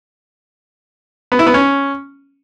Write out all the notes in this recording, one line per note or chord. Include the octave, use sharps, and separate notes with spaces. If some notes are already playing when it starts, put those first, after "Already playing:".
B3
E4
B3
C#4